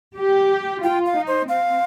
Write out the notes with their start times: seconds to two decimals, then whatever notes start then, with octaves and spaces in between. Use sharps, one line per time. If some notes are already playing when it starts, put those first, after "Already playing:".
0.17 G4
0.83 F4 G5
1.06 F5
1.17 D#4
1.27 C5
1.49 C4 F5